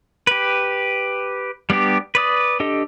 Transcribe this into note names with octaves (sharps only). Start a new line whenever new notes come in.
G4 B4
G3 B3 D4 G4
B4 D5 D#6
D4 G4 A4 D#5